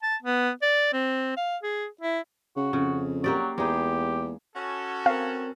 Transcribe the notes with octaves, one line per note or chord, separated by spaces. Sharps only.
A5
B3
D5
C4
F5
G#4
E4
C#3 F#4
F2 C#3
F#3 A#3 G4 D5
E2 G#3 D#4 G4
C#4 F#4 A4
C4 A#4 F5